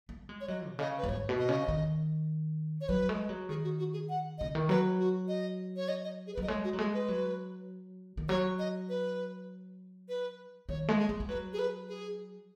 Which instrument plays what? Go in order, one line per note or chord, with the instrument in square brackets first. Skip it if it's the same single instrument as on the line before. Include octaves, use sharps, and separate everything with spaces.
[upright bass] B3
G#3
[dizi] C#5
[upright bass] F#3 [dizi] D#5
[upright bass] B2
[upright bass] C#3 [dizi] D#5
[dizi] B4
[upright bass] F#2
[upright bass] G#2 [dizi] C#5
[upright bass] B2
[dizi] D#5
[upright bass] C#3
D#3
[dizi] C#5
[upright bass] F#3 [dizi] B4
[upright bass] G#3
F#3
[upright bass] D#3 [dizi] G#4
[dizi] F#4
F#4
G#4
F#5
[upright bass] C#3 [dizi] D#5
[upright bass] D#3
[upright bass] F#3 [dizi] B4
[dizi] F#4
D#5
C#5
D#5
D#5
G#4
B4
[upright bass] F#3
[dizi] D#5
[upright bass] G#3 [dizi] C#5
[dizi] F#4
[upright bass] F#3
[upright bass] G#3 [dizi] G#4
[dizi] B4
[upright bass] F#3
D#3
[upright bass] F#3 [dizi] C#5
[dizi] D#5
B4
B4
[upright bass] D#3 [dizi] C#5
[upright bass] G#3
[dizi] G#4
[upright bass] G#3
G#3
[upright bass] F#3 [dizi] B4
[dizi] G#4
B4
G#4